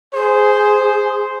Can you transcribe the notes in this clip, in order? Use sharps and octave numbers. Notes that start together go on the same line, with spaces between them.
G#4 C5